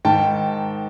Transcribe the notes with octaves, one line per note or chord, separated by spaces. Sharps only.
G#2 D#3 G5 A5